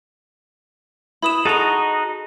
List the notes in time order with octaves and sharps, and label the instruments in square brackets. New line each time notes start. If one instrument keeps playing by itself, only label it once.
[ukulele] E4 B4 [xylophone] B5 D#6 E7
[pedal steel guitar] D#4 F#4 D#5 [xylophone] G#4 F7 [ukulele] A4